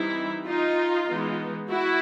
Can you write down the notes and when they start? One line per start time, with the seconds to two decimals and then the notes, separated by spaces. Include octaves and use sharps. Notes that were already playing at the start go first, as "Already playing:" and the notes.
Already playing: E3 G3 C4 D#4 E4
0.46 D#4 F4
1.08 E3 G#3 B3 D#4
1.69 E4 F#4